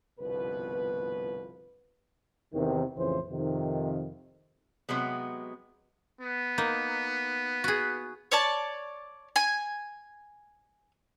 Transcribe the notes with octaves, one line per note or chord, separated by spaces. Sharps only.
G1 C2 B2 F3 B4
E2 C3 D#3
A1 F2 C#3 E3 C5
F2 C3 D#3
C3 F#3 G#3 B3
B3
A#3 D#4
F#4 G#4
C#5 D5 A5
G#5